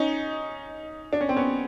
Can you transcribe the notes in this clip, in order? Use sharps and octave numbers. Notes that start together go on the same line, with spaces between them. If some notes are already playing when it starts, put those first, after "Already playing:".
Already playing: C#4 D#4
D4
C#4
C4
B3 C#4